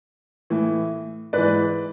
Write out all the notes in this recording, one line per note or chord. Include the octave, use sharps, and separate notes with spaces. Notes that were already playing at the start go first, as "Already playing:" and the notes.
A2 E3
G#2 E3 B4 D5